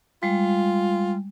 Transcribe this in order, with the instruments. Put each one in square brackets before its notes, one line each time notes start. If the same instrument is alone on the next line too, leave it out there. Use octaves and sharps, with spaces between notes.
[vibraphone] G3 G#3 [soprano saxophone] F4